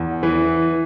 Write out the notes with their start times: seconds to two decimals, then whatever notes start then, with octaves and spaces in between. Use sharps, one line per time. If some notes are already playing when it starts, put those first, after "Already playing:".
Already playing: E2
0.23 E3